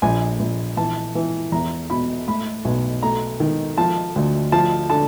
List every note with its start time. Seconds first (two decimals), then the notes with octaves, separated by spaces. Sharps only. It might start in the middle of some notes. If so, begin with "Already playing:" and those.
0.02 A#1 G#5
0.40 A#1
0.77 E3 A5
1.15 E3
1.52 E2 A#5
1.90 B2 B5
2.27 A2 B5
2.65 B1
3.03 A3 A#5
3.40 D#3
3.78 F3 A5
4.16 D2
4.52 F3 A5
4.90 D3 A5